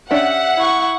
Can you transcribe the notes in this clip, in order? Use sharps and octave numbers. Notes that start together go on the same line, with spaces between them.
C#4 D4 G4 E5 F#5
E4 C#6